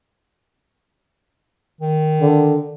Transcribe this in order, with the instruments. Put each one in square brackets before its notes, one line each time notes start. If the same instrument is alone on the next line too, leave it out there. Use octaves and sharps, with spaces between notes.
[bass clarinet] D#3
[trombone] D3